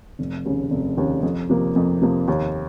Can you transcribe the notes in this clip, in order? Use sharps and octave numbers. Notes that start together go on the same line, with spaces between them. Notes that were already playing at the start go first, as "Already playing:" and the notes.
F1
D#2 C#3
F1
D#2 C#3
F2
C3 F3 A#3
F2
C3 F3 A#3
D#2